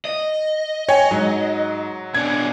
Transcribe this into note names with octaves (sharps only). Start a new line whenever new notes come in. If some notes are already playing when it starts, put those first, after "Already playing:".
D#5
C#5 G5 G#5
G#2 F#3
B2 D4 G#6